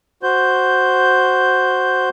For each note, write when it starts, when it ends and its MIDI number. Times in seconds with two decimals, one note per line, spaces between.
0.23 2.09 66
0.23 2.09 72
0.23 2.09 91